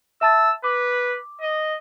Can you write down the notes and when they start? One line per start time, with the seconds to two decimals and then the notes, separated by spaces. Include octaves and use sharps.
0.21 E5 A5 E6 A6
0.64 B4 D6
1.41 D#5